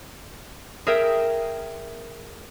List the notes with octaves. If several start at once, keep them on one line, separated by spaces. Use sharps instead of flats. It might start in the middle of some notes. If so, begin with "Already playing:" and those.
G#4 A#4 E5 G5